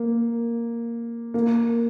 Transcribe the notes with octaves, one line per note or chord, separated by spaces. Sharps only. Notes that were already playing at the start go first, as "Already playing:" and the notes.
Already playing: A#3
A#3